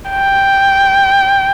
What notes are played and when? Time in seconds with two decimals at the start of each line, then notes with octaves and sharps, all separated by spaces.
0.11 G5